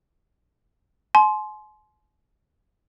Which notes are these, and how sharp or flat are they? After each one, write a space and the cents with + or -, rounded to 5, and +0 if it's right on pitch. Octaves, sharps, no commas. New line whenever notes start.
G#5 +45 C6 +0